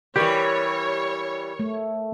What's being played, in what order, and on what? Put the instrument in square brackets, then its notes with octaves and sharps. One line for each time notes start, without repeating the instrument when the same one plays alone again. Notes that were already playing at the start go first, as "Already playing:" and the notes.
[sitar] E3 G3 [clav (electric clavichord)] G4 [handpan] A#4 [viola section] C#5
[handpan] A3